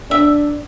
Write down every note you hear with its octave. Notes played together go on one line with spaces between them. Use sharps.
D4 E5